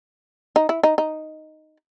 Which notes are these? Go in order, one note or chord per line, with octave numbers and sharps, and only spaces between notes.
D#4
E4
D#4
D#4